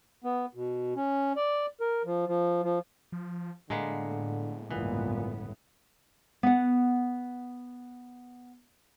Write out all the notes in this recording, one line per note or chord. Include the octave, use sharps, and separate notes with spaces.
B3
B2
C#4
D5
A#4
F3
F3
F3
F3
A2 D3 G#3 A#3 B3
G1 C#2 A#2 E3 B3
B3 F#5